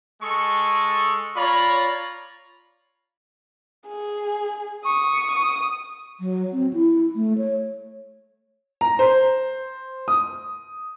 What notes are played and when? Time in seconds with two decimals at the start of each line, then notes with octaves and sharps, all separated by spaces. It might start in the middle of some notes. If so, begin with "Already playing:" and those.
0.22 G#3 A4 C#6
1.37 F4 C#5 D5 A#5 B5
3.88 G#4
4.85 C#6 D#6
5.31 D#6
6.19 F#3
6.53 C4
6.73 E4
7.16 A3
7.38 C#5
8.81 A#5
8.99 C5
10.08 D#6